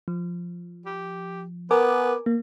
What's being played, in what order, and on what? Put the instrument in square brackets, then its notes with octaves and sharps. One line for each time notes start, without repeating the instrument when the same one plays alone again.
[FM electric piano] F3
[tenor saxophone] G4
[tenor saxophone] B3 [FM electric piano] A#4 G#5 D6
[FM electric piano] A#3